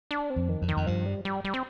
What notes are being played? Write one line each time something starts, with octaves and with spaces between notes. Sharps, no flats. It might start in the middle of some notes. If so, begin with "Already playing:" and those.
D4
C4
F2
D#3
F2
D#3
F2
G2 F3
G3
G3
G3
C4